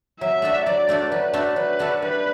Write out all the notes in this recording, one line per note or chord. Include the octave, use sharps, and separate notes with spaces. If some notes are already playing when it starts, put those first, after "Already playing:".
F#3 E5
A3 D4 F#4 A4
F#3 D5
A3 D4 F#4 A4
F#3 B4
A3 D4 F#4 A4
F#3 B4
A3 D4 F#4 A4
G3 B4